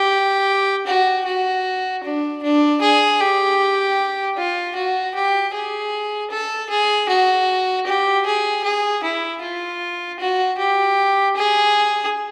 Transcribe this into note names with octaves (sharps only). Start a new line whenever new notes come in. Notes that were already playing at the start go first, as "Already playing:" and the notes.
Already playing: G4
F#4
F#4
D4
D4
G#4
G4
F4
F#4
G4
G#4
A4
G#4
F#4
G4
G#4
G#4
E4
F4
F#4
G4
G#4